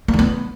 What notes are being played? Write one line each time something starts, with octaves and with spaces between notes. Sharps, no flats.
A#3
D#3
B3